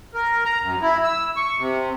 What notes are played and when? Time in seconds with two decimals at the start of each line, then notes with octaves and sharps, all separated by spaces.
0.14 A#4
0.45 A#5
0.63 F#2
0.82 E4
1.04 E6
1.36 C#6
1.59 C3